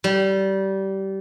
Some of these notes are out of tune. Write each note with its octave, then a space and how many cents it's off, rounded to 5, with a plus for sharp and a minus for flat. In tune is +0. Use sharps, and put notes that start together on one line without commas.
G3 -20